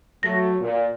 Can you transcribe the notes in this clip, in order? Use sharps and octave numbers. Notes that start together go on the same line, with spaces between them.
F#3 A3 A#6
A#2